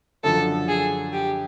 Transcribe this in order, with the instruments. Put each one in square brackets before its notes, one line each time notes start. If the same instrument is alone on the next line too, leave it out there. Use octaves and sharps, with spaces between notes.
[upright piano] F#2 D3 F3 [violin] A4
[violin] G#4
G4